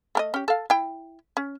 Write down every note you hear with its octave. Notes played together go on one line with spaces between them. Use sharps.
A3 A#4 D#5
C#4 G4
A4 F5
E4 G5
C#4